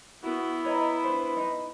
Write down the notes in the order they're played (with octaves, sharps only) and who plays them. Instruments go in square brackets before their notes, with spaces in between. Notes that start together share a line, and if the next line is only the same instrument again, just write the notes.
[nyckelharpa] B3 E4 [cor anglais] F#4
[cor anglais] B4 [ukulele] C#5 D#5 A#5
[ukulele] D4 C5
D#4 D#5